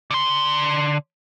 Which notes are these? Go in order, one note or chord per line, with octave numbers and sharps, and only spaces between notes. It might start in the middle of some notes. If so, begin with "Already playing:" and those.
D3 C6